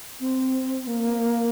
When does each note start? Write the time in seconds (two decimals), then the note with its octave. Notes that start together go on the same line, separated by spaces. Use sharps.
0.20 C4
0.87 A#3